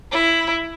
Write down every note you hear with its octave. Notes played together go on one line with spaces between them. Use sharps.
E4